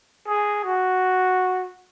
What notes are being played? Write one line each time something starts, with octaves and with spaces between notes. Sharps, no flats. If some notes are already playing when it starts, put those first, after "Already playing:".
G#4
F#4